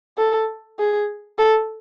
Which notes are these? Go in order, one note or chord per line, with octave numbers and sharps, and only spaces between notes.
A4
G#4
A4